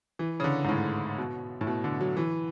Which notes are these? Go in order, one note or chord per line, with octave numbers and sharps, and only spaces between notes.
E3
C#3
D3
G#2
A2
B2
A2
B2
D3
F#3
E3